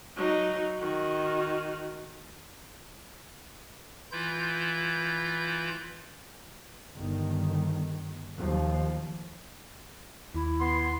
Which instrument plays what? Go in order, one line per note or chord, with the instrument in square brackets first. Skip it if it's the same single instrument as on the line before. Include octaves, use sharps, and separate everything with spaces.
[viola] F#3 D#4
D#3 F#4
[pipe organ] E3 E4 F4 G6
[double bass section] G1 D#3
D#2 F3
[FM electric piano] D#2 [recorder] E4
[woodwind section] B3 C6